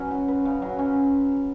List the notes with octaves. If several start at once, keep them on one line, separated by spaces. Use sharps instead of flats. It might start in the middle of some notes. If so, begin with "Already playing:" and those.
Already playing: F#3 C#4 B4
F#4
B4
C#3
F#3
C#4